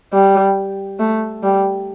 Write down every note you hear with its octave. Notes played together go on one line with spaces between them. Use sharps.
G3
A3
G3